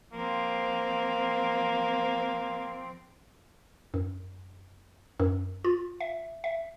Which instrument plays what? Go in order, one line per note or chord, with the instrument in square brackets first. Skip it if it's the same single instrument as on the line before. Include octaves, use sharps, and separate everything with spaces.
[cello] F3 C4 [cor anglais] A#3
[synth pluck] F#2
F#2
F4
E5
E5